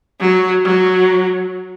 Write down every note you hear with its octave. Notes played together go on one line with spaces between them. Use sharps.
F#3
F#3